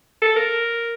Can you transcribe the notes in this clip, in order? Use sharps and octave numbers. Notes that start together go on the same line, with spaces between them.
A4
A#4